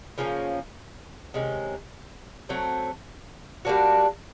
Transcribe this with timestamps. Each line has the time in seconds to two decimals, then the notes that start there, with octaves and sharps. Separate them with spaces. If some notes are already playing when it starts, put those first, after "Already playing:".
0.18 C#3 F3 A#3 C#4
1.34 C3 D#3 G#3 C#4
2.49 F#3 A3 C4
3.65 G3 A#3 D4 F#4